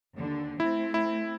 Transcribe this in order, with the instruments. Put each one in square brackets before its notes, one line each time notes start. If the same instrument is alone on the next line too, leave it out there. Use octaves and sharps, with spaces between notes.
[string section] D#2 D3
[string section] A3 C4 C5 [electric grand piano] E4
[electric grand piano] E4